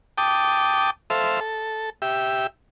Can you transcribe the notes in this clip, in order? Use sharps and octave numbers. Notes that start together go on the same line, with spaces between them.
G5 A5 D6 D#6
A4 C5 E5 F5
A4
G4 E5